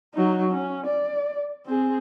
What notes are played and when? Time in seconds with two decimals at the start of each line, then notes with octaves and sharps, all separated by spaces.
0.14 F#3 D#4
0.52 C#4
0.87 D5
1.66 C4 G#4